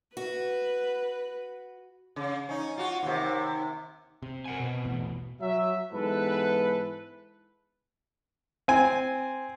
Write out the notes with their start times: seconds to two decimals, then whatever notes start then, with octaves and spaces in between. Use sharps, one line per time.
0.17 F#4 B4
2.16 C#3
2.49 C#4 D#4
2.78 F4 F#4
3.03 D#2 C3
4.22 C3
4.45 A#4 F#5 G#5
4.60 B2
4.85 A1 E2
5.41 F#3 E5
5.93 G#2 E3 B3 A4 B4
8.68 C4 G#5